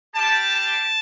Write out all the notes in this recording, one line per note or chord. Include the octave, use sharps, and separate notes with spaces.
G3 D4 G4 A5
A5